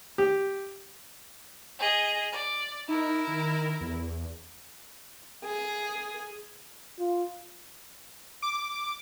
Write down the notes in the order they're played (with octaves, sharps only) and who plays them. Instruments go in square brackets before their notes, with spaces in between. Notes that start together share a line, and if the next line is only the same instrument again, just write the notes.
[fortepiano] G4
[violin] G#4 D#5
D5
[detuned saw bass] D#4 [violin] E4 A#4
[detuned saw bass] D#3
E2
[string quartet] G#4
[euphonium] F4
[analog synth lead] D6